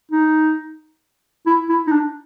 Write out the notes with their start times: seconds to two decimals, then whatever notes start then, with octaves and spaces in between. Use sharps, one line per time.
0.12 D#4
1.46 E4
1.69 E4
1.87 D#4
1.92 D4